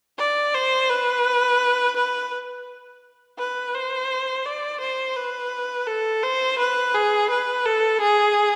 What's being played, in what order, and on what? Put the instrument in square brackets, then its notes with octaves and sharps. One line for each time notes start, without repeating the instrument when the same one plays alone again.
[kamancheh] D5
C5
B4
B4
B4
C5
D5
C5
B4
A4
C5
B4
G#4
B4
A4
G#4